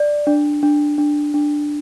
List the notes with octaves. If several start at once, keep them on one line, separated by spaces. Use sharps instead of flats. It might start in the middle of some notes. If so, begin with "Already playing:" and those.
Already playing: D5
D4
D4
D4
D4